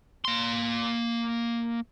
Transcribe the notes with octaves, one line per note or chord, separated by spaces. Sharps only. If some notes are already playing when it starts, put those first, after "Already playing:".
A#3 C6